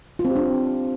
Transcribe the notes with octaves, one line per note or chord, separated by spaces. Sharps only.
F4
C4
G4
D4